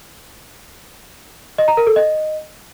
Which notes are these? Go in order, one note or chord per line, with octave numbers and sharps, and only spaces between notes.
D#5
A#5
A#4
A4
D#5